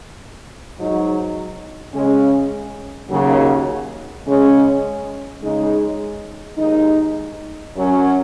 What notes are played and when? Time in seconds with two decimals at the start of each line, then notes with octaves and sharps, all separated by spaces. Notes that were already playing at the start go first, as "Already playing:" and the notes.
0.77 G#2 F#3 D#4
1.93 C#3 G#3 C#4
3.09 D#2 C#3 F#3
4.26 C#3 G#3 C#4
5.42 C#3 G#3 D#4
6.57 D#2 D#3 G#3 D#4
7.73 F#2 F#3 C#4